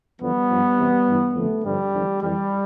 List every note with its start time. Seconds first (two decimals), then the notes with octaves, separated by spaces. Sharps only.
0.20 E2 D3 F3 G3 B3
0.50 G2 F3
0.78 E2 C3 E3
1.07 G2 E3
1.35 F2 D3 F3 A3
1.64 G2 D3 F3 G3
1.93 E2 D3 F3
2.22 F2 E3 G3